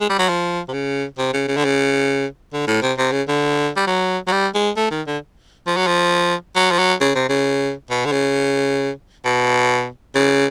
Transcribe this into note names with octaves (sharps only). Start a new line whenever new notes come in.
G#3
G3
F#3
F3
C3
C#3
C3
C#3
C#3
D3
C#3
D3
A2
C3
C3
C#3
D3
G3
F#3
F#3
G3
G#3
A3
D#3
D3
F3
F#3
F3
F#3
F3
F#3
C#3
C3
C#3
B2
D3
C#3
B2
C#3